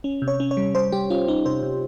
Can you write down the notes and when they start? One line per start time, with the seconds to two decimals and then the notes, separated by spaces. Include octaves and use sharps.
0.04 C#4
0.22 C3
0.28 C#5
0.40 C#4
0.51 C#5
0.57 G3
0.74 G3 C5
0.92 G3 G4
1.10 C#4 F4
1.28 C#4 D#4
1.46 C3 C5
1.63 C3